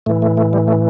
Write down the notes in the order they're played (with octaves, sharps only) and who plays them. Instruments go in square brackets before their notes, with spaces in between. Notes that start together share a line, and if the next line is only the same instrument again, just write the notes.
[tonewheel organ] A2 E3 A3
A3
A3
G3
A3